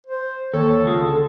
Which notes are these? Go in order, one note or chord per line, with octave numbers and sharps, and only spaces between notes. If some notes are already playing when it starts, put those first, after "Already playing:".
C5
D#2 A4 C#5
C#2 G#3 F4
D3